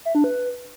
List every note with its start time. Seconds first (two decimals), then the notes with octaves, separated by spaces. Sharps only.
0.05 E5
0.15 D4
0.24 B4